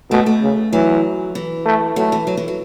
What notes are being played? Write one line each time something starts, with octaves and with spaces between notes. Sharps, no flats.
B2 A3
A3
C#3
E3 F#3
E3
A3
F#3 A3
E3
F#3
E3
F#3